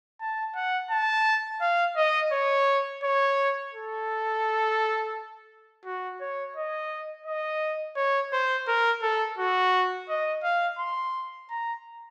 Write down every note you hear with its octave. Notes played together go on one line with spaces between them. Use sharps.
A5
F#5
A5
F5
D#5
C#5
C#5
A4
F#4
C#5
D#5
D#5
C#5
C5
A#4
A4
F#4
D#5
F5
C6
A#5